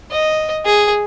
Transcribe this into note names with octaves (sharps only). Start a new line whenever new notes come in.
D#5
G#4